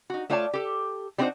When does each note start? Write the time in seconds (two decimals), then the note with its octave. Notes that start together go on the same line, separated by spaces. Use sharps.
0.10 D#4 F#4
0.30 A3 F4 C#5 D5 F5 A5
0.53 G4 A4
1.18 G3 C4 D4 D#4 F#4 C5